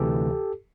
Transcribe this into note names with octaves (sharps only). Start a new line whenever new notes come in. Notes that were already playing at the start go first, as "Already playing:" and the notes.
Already playing: D2 C3 E3 G4 A4